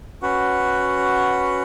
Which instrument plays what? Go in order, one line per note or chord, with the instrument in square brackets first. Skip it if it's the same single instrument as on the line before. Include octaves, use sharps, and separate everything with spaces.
[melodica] C#4 F#4 B4 F#5